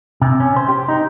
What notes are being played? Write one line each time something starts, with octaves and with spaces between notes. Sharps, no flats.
C3
C#4
C5
G4
D#4